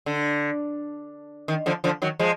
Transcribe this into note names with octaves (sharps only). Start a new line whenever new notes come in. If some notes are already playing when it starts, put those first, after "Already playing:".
D3
D#3
D3 F3
D3 F3
D#3 F#3
F3 G#3